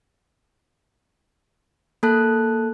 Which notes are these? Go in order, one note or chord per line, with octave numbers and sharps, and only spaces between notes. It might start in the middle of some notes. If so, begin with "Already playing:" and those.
A#3 A4 A5 F#6